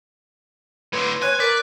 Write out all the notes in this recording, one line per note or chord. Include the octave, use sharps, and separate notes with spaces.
A2 D3 B4 C6
C#5 G#5 F#6
A#4 D5 B6